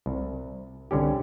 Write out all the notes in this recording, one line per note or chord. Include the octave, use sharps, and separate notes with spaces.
C2
C2 D3 C#4 G4